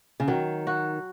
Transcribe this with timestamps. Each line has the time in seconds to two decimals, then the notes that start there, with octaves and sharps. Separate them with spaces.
0.20 C#3
0.28 D#3 F#3
0.67 F#4